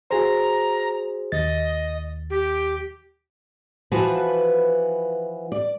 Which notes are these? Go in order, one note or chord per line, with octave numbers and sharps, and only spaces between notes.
F#4 G#4 C5 A#5
D#2 D#5 A6
G4
E3 F3 F#4 B4
D5